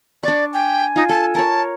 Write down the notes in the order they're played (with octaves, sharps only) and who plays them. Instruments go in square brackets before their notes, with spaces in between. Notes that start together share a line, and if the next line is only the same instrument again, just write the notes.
[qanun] D4 C#6 [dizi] D5
[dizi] G5 [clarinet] G#5
[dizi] D#4 [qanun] F4
[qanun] A4 [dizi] A5
[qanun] A#4 C#5 [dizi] A5